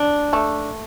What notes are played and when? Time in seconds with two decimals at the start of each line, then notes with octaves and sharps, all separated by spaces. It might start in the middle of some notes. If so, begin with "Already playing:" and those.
Already playing: D4
0.33 A3